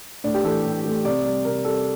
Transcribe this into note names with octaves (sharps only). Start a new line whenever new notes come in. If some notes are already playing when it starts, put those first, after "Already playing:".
A2 D4
G4
E3 A3 A4
A2
E3 A3
C3 D5
G3
C3 A#4
G3 A4